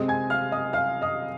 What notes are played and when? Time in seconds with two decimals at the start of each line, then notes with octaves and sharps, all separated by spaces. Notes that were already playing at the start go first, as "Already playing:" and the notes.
Already playing: C3 G#3 C4 D#5 D#6
0.08 G#5 G#6
0.30 F5 F6
0.52 D#5 D#6
0.73 F5 F6
1.02 D#5 D#6